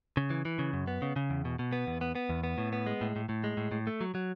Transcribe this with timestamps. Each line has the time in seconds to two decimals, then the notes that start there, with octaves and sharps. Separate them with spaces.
0.17 C#3
0.30 E3
0.45 E3
0.59 C#3
0.73 F#2
0.87 B3
1.02 C#3
1.16 C#3
1.30 E2
1.45 B2
1.59 B2
1.72 B3
1.87 E2
2.01 B3
2.15 B3
2.29 E2
2.44 B3
2.58 A2
2.73 B3
2.86 G#3
3.01 A2
3.16 A2
3.29 A2
3.44 G#3
3.57 A2
3.72 A2
3.87 A3
4.01 F#3
4.15 F#3